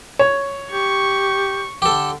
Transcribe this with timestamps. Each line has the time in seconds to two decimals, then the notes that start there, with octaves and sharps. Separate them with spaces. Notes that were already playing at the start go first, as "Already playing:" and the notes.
0.19 C#5
0.72 G4 C#6
1.82 D3 G4 A4